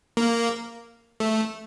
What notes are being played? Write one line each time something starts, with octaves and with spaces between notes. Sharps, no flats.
A#3
A3